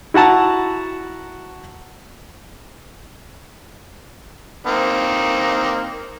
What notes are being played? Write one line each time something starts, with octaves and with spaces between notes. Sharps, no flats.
E4 F#4 F#5 A5 A#5
A#3 C4 D#4